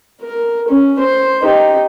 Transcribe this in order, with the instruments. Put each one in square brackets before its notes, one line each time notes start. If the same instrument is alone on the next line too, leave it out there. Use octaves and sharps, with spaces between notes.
[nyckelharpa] A#4
C#4
C5
D#4 G4